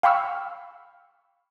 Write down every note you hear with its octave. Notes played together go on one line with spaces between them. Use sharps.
F5 G5 B5 C#6 E6 F6